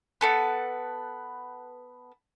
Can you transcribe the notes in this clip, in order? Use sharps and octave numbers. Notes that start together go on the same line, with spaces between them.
B3 A4 B4